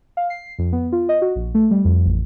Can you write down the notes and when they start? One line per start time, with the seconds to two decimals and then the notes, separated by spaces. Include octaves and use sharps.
0.17 F5
0.30 C7
0.59 F2
0.72 B3
0.92 F4
1.09 D#5
1.22 F#4
1.35 A#1
1.55 A3
1.71 G3
1.85 F2
2.06 A1